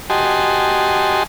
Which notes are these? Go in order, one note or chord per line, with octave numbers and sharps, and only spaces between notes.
F#4 G4 D#5 G#5 A5 C6